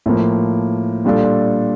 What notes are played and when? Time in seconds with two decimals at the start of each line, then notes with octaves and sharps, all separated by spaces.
0.06 A2 F3 A#3
1.05 A#2 G3 D4 F4 A4